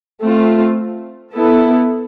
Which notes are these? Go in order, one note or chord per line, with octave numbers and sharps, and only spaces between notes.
A3 C4 F4
B3 E4 A4